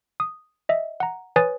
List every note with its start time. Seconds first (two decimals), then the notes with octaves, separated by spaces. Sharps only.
0.20 D#6
0.69 D#5 E5
1.00 F#5 A#5
1.36 B4 C#5 G#5 D#6 A6